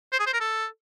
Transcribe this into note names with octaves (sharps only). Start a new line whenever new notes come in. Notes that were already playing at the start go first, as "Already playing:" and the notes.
C5
G#4
C5
A#4
A4